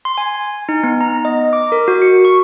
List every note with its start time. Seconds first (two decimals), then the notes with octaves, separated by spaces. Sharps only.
0.05 C6
0.18 G#5
0.69 D#4
0.84 B3
1.01 A#5
1.25 D#5
1.53 D6
1.72 A#4
1.88 F#4
2.02 C#7
2.25 C#6